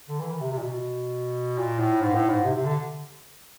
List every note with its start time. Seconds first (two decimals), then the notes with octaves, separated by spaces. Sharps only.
0.09 D3
0.20 E3
0.30 D#3
0.40 C3
0.51 C3
0.57 A#2
0.61 B2
1.58 A#2
1.79 A2
2.01 G#2
2.14 A2
2.29 G#2
2.44 C3
2.55 C3
2.64 D3